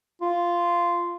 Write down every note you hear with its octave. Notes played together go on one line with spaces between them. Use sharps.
F4